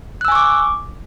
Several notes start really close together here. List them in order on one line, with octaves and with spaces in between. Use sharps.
F#6 E6 G#5 C#6 D6